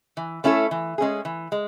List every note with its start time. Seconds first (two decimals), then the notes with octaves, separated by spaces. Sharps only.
0.17 E3
0.44 A3 C#4 E4 A4
0.71 E3
0.98 G#3 C#4 G#4
1.25 E3
1.52 G#3